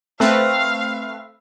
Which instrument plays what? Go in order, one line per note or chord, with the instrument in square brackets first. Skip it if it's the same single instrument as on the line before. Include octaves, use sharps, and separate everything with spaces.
[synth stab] A3 C4 B4 [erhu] F5 [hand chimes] E6